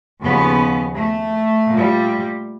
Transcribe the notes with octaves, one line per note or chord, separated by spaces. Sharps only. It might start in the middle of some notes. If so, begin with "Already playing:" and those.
D#2 C#3 F3 B3
A3
A#2 G3